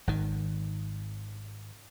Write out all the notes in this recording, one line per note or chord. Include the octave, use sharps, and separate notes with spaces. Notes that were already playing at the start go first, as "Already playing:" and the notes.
G#1 D#3